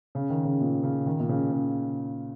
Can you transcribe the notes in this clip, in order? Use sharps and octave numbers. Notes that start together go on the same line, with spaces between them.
C#3
D#3
C#3
A#2
C#3
D#3
A#2
C#3
C#3